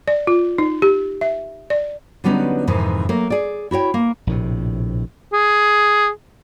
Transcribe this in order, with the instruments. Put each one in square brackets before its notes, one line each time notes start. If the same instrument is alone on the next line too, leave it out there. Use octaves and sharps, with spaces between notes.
[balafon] D5
F4
D#4
G4
E5
D5
[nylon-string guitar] D3 F#3 G3 B3 C#4 D#4
F2 G#2 C3 D#3 E3
F#3 A3 A#3
G#4 D5
E4 F#4 C#5 G5
A#3
[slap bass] A#1 A2 C3
[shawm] G#4